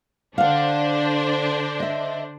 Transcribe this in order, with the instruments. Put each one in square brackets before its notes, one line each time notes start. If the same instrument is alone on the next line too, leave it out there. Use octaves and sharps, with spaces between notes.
[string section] D3 D4 C5 [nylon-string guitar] F5 F#5
[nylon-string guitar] D#5 E5